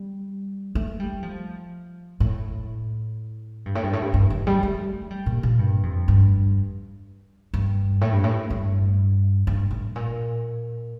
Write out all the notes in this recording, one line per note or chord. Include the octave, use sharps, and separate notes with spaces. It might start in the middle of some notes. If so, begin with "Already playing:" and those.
Already playing: G3
A3
G3
F3
A2
G2
A2
G2
A2
G2
G2
D#3
G3
A3
G3
A#2
A#2
G2
F2
G2
G2
A2
G2
A2
G2
G2
A2
A#2